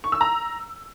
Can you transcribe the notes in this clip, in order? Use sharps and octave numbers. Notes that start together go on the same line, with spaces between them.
C#6
E6
A#5